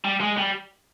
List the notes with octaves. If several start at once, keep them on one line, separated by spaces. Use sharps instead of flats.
G3
G#3
G3